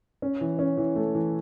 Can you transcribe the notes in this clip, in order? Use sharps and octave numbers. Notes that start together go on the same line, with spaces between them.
C#4
E3
C#4
E3
A3
E3